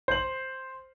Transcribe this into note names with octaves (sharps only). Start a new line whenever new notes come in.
C5 F#7